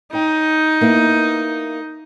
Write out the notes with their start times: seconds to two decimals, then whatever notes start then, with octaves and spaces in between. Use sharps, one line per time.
0.13 D#4 C#5 G5
0.81 A#3 B3 E4